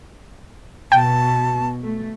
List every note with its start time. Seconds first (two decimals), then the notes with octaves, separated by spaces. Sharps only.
0.92 B2 G5 A5
1.82 A3